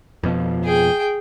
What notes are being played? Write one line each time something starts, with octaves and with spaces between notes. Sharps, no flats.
F2 B2 F3
G#4 G5